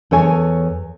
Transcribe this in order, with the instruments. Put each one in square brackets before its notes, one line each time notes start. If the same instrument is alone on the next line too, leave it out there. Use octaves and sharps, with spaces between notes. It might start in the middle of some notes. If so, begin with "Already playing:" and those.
[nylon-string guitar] E2 A4 C#5 G#5